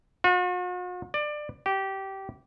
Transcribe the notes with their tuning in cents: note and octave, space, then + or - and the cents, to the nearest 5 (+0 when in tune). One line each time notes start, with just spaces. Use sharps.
F#4 -45
D5 +20
G4 -20